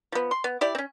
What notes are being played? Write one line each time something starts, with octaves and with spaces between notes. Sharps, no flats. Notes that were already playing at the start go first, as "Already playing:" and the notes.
F3 B3
C6
B3
E4 G4 D5
C4 C#4